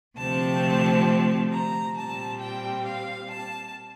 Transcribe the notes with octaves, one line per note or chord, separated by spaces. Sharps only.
D2 C3 F3 A3 C4 A5
A#5
A#2 G3 C4 A5
G5
F5
A5